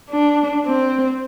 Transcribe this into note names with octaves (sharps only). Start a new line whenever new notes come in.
D4
C4